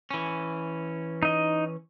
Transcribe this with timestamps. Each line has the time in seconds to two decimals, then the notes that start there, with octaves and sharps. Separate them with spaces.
0.11 E3 C#4
1.23 D#4 D#5